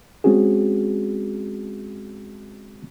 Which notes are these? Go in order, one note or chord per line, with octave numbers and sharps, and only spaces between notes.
G#3 C4 C#4 F#4 G#4